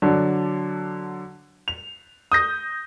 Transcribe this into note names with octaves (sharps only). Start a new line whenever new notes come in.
D3 F#3 D4 A5
F7
D#6 G6 A#6